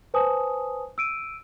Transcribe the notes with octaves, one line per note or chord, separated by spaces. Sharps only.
B4 C5 G#5 A5 D#6
E6 D7 D#7